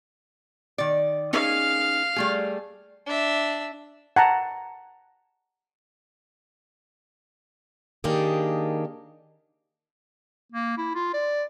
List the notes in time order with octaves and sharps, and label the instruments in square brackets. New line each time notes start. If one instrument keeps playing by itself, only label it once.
[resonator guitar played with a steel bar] D#3 D5
[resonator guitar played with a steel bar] C#4 D#4 G#4 [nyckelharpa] F5
[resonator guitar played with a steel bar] G3 A3 G#4
[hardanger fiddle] D4 E5
[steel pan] F#5 A5 A#5
[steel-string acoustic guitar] D#3 A#3 D4 G4 G#4
[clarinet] A#3
E4
F4
D5